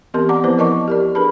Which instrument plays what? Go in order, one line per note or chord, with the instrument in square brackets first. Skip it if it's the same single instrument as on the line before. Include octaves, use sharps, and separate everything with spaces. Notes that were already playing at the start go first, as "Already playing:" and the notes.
[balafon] E3 B3 C4 G4 A#4 C6
D5 F#5 A5 A#5 D6
F3 B3 C4 E4 B4 C5
A#4 D5 D#5 A5 C#6 D6
G4 A#4 D5
D4 G#4 A#4 B4 A5 B5